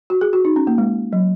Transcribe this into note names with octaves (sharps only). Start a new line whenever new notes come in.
F#4
G#4
F#4
D#4
C#4
A#3
G#3
F#3